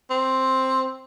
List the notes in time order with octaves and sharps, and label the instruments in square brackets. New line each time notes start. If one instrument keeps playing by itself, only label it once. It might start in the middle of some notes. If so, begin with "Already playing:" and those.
[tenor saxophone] C4